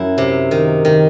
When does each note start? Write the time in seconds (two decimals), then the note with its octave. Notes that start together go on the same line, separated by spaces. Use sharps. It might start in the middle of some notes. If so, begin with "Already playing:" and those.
Already playing: F#2 E4
0.18 C3
0.51 D#3
0.85 D#3